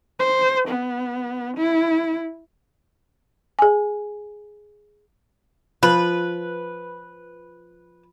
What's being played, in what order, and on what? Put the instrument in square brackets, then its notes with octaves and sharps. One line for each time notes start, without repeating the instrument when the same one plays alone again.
[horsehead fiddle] C5
B3
E4
[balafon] G#4 G#5
[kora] F3 [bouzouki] B4